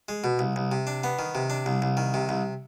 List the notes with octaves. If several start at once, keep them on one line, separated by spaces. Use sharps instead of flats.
G#3
B2
C2
C2
C3
D4
B3
D#3
C3
D4
C2
C2
D#3
C3
C2